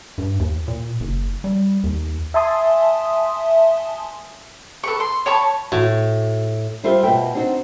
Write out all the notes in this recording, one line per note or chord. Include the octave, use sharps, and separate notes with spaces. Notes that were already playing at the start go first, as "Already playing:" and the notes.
G2
D#2
A#2
F#1
G3
D#2
E5 G#5 A5 C6 D#6
A4 B4 C#6
C6
C#5 A5 B5 C#6
A2 F#4
G3 F4 A4 C5 E5
B2 B4 E5 G5
C4 D4 D#4 F#4